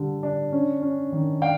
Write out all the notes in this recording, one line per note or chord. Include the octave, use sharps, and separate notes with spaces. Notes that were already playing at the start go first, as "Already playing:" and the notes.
Already playing: D3 G3
D4
C#4
C#4
D#3
D4 F5 G5